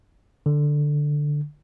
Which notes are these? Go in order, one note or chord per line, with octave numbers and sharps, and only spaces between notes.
D3